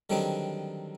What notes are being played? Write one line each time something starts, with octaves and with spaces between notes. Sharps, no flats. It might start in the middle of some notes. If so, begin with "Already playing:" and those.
D3 D#3 F#3 G3 C4 D#4